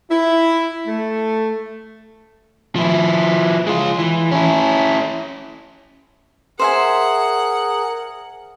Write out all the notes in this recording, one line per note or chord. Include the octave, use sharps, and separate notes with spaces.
E4
A3
F3 E4
G#3 F4
E3
C#4 E4
G#4 A#4 C5 E5 F#5 G#5